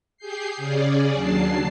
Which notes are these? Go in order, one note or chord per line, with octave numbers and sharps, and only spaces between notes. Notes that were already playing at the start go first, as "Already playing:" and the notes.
G4 G#4 G6 C7
C#3 C#4 G#4 D5
D#2 F#3 D4 A5 C7